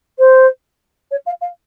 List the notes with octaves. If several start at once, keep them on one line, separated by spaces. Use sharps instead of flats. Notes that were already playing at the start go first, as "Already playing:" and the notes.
C5
C#5
F5
F5